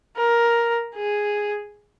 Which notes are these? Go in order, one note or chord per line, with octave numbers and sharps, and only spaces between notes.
A#4
G#4